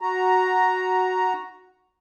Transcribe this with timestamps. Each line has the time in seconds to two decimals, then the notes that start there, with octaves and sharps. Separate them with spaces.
0.01 F#4 A#5